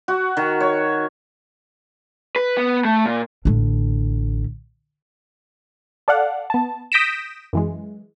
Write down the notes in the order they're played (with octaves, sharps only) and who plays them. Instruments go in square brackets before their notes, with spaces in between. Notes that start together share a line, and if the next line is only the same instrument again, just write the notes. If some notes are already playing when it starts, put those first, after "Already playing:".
[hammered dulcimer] F#4
D#3
C#5
[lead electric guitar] B4
B3
A3
A#2
[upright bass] A1 D3
[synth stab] A4 D5 F5 F#5
B3 A5
D#6 G6 A#6 B6 D7 E7
F#2 E3 G#3